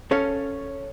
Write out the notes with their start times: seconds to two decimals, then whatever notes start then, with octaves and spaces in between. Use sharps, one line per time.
0.11 C#4 A4 C#5 F5